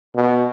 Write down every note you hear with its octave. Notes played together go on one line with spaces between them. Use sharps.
B2